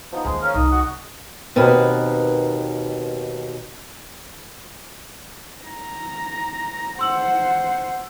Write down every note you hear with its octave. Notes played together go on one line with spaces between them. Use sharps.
F3 B3 D#4 C5 D#6
D#2 G#3 G#4
C#4 A#4 F5
C2 D#4 D#5
F#4 F#5
D#2 B2 C4 A#4 B4
A#5
C5 F#5 C6 E6 F#7